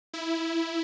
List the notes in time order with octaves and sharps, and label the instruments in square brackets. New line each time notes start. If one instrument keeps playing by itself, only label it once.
[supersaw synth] E4